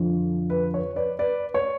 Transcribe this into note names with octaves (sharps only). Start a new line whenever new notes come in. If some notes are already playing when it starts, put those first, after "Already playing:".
Already playing: F2 D3 F3
B4
C#5
B4 D5
B4 D5
C#5